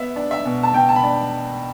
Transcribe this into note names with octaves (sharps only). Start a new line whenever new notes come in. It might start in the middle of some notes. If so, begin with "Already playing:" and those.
Already playing: B3 E5
D4
E5
B2
A5
B2 G5
A5
B5
D4